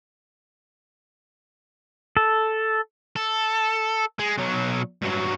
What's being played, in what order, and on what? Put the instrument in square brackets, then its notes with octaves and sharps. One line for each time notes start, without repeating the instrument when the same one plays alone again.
[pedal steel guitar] A4
[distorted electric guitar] A4
G#3
B1 F#3
G2 F#3